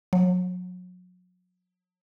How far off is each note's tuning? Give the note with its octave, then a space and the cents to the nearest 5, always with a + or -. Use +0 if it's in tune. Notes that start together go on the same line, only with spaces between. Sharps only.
F#3 -35